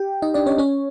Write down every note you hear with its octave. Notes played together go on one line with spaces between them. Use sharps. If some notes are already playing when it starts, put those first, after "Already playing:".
Already playing: G4 G5
D#4 D#5
D4 D5
C#4 C#5
C#4 C#5